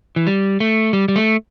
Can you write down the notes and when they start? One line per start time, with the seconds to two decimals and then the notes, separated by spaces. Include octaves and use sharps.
0.16 E3
0.27 G3
0.60 A3
0.93 G3
1.08 G3
1.16 A3